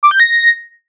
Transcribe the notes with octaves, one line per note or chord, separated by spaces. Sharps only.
D6
G6
A#6